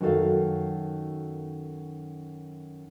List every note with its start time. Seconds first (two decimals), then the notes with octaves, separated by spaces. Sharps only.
0.01 F#2 D#3 F#4 A4 F5